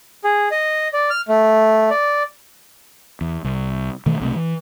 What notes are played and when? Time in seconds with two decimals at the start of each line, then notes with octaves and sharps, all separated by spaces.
0.24 G#4
0.51 D#5
0.93 D5
1.10 F6
1.28 A3
1.90 D5
3.21 E2
3.44 C2
4.06 B2 D#3 E3 A3
4.20 B1 C3 A3
4.36 E3